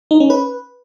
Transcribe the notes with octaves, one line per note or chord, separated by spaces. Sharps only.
D#4
C#4
B4